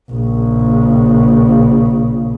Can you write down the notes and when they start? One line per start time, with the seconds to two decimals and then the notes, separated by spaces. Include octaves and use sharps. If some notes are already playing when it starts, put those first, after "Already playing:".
0.11 A#1 C#3